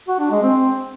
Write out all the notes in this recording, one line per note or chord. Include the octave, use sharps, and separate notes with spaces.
F#4
D4
G#3
C4